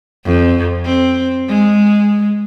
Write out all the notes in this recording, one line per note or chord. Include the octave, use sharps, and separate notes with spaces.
F2
C4
G#3